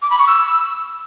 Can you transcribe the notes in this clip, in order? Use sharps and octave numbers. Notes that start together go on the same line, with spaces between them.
D6
B5
C#6
E6